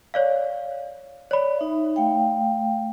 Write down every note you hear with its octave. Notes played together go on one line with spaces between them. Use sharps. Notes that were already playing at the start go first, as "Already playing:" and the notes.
C#5 D5 F5
C#5 D5 B5
D#4 E5
A3 F5 G5